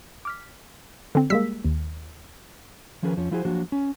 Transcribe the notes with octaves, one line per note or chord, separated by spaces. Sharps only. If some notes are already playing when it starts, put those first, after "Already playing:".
D6 F6 B6
D3 C4
G3 G#3 A#3 E6 B6
D#2
D#3 F3 C#4 G#4 A#4 B4
F2 F3 C#4
F3 A3 E4 F#4 G#4 C5
F3 F#3 A#3 D4 F4 F#4
C#4